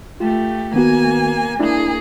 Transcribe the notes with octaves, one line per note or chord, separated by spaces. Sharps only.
A3 F4 G4
D#3 A#3 B3 F#4 G#5
A#3 D4 E4 G#4